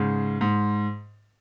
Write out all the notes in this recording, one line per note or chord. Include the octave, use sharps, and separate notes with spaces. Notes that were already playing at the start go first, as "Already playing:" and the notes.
Already playing: G#2 C#3
G#2